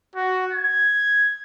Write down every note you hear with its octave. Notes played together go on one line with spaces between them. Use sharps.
F#4
G#6